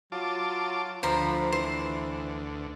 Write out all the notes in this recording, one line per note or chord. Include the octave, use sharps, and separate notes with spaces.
F#3 F4 A5 D6
D2 F3 C5 A#5 B5
E3 C5